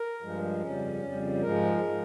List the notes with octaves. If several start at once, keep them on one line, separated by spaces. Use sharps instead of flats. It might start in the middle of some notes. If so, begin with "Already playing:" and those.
Already playing: A#4
G2 F3 G#3
F2 C#3 G3 C#4
F2 C#3 G3
G#2 F3 G#3 A#4
F3 G#3